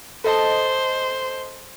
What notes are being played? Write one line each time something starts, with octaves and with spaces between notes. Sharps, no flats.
A4 C5 D#5 A5